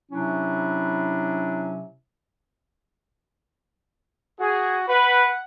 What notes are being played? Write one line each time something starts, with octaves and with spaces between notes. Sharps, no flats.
C3 F#3 C#4 D4 E4
F#4 G#4
B4 F#5